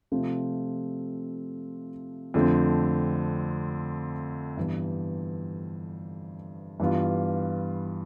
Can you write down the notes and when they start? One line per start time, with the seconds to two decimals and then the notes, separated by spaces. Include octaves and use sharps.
0.12 C3 F3 A3 C4 F4
2.34 F2 D3 A3 C4
4.57 G2 E3 B3
6.80 G2 E3 B3 F4